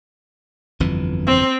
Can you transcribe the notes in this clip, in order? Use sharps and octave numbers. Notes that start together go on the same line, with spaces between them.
G1 F2 E3
C4